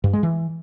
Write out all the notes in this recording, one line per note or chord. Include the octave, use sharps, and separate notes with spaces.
G2
G#3
E3